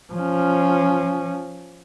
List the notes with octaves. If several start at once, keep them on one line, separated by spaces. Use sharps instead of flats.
F3 C#4